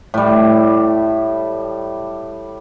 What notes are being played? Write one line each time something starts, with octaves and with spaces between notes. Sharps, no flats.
A2 G3